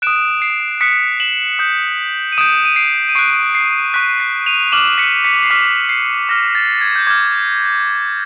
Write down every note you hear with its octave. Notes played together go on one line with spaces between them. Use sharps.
D#6 F#6 D7 E7
C7 D7
D#6 F#6 B6 C#7
E7 F#7
D#6 G6
D#7
D#6 G6 D7 E7
D#7
C7 D7
D#7
C#6 F#6 C7 D7
C7
C#6 F#6 B6
C7
D#7 F7
D6 F6 E7 F#7
B6 C#7
B6 C#7
C7
D6 F6 B6
C7
D6 F6 A#6
A6
G#6
G6
D6 F6 G#6